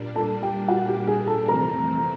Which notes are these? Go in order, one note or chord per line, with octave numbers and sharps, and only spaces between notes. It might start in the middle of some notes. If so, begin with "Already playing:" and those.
Already playing: A#2 G3 A#3 D4
A4 A5
G4 G5
F#4 F#5
G4 G5
G#4 G#5
A4 A5
F2 C3 E3 A3 C4 A#4 A#5